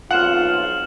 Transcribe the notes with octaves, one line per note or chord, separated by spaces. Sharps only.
B1 F2 F4 F#5 F6 E7 F#7